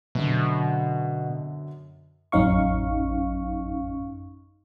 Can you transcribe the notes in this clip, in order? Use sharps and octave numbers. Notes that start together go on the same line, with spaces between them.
F#2 B2 D3
A1 F#2 C#4 D#4 F5 C#6